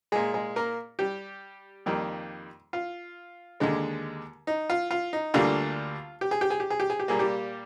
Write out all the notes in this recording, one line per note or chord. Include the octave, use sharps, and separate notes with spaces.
A#2 G#3 G#4
G#3 G#4
A#3 A#4
G3 G4
F2 D#3 G3 A#3
F4
D#2 D3 G#3
D#4
F4
F4
D#4
D2 D3 G3 A#3 F4
G4
G#4
G4
G#4
G4
G#4
G4
G#4
G4
A#2 G3 A#3 G#4
G3 G4